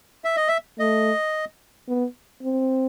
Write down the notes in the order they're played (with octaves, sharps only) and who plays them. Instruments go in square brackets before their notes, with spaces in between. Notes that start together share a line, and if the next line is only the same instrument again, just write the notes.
[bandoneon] E5
D#5
E5
[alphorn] A3 [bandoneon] D#5
[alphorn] B3
C4